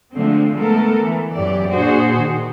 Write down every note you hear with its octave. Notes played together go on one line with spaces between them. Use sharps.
D3 F3 G#3 A3 C4
G#3 A3 B3 A4 A#4
E3
F#2 E3 G4 D5
A#2 D4 F#4 G#4 C5
D#3